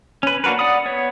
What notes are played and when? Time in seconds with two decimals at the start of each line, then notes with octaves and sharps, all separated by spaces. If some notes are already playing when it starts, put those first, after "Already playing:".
0.23 C#4 B4
0.44 A#3 D4 F#4 A#4 B4
0.59 D5 F#5 B5 D#6
0.85 B3 C#5